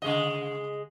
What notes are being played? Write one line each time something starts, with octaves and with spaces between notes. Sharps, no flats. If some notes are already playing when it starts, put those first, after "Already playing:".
C#3 G#3 D#5